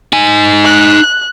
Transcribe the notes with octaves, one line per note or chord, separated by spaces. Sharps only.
D#4 G#5
F#6